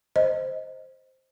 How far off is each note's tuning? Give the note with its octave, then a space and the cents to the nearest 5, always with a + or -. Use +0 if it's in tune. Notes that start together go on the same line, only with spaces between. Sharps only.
C5 +0 D#5 +0